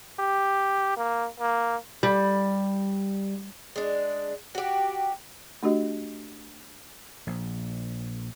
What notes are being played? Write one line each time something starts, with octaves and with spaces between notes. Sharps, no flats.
G4
A#3
A#3
G3
G#3 D4
F#4 G4
A3 D4 F#4 G4 D#5
A#1